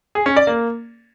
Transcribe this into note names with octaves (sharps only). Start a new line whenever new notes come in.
G#4
C#4
D5
A#3